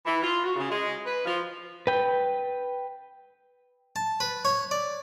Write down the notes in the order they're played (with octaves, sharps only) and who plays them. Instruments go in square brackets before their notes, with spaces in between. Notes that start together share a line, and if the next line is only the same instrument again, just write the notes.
[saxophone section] E3
F4
F#4
C#3
G#3
B4
F3
[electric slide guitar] B4 G5
[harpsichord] A5
B4
C#5
D5